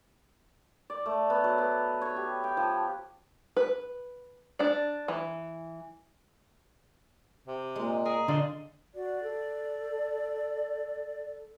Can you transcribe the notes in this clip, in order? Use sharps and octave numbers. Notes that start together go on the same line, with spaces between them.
D5
A3
B3
F#3
B3
C#5
G4
G5
F3
B4
D4 D5
E3
C3
A#2 G#3
G#4 A#4
D3 F4 D5 D#5
F#4 D5
A4